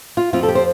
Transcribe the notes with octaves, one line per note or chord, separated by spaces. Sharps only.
F4
F2 F3 C4 F4
A4
G4
C5